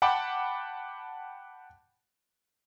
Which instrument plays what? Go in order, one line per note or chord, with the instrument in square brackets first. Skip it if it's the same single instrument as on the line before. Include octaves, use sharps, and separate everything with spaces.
[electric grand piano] F#5 G5 A5 B5 D6